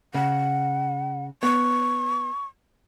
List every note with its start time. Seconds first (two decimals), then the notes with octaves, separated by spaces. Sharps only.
0.14 C#3 F#5
1.43 B3 C#6